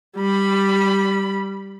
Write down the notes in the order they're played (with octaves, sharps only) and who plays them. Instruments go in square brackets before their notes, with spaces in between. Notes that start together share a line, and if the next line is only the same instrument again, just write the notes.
[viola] G3 B5